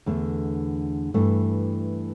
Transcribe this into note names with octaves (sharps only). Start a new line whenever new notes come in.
E2 D3 A3
G2 E3 A3